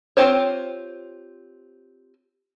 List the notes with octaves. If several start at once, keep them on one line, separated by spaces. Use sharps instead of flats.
C4 F4 G4 C5 C#5